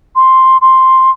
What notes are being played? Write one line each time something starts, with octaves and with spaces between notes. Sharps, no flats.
C6
C6